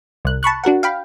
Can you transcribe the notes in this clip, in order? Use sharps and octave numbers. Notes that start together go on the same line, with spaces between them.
C2 F#6
A5 B5 C#6 F#6
D4 F#4 A#4 F#5
F5 G5 B5